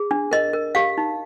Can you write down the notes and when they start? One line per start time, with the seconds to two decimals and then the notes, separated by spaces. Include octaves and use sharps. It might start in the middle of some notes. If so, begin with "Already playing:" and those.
Already playing: G#4
0.11 D4
0.31 A#4 D#5
0.53 A#4
0.75 G4 F5
0.98 D#4